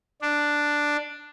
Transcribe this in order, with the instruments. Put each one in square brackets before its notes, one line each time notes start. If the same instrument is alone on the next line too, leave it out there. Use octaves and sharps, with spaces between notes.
[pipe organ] D4